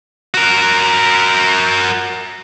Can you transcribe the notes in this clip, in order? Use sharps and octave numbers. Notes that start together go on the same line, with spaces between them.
F#4 A#4